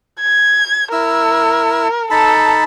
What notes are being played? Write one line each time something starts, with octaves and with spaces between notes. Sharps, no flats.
G#6
E4 A#4 E6
D#4 A4 A5 B5